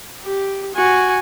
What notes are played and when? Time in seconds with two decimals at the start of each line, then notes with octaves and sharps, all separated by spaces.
0.24 G4
0.75 F#4 G#5